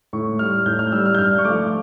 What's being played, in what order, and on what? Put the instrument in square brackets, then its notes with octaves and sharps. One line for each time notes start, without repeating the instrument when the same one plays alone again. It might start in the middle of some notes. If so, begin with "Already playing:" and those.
[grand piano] A2 C#6
G3 F6
A2 G6
F6
G3 E6
F6
G6
G2 F6
C#6
F3 A3 D6